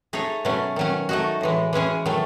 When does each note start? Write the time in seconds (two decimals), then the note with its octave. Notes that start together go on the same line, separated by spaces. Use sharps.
0.13 A3 D#4 G#4 C#5
0.45 B2 F#3 A3 C#4
0.76 D#3 F#3 C#4
1.09 A3 D#4 F#4
1.41 A2 E3 G#3
1.73 E3 G#3 C#4 G#4
2.06 D#3 F#3 A3